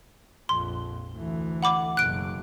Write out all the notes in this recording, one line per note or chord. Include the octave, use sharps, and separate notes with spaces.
A#1 F2 C6
D2 E3
F#5 B5 D6
F#1 B2 F#6 D7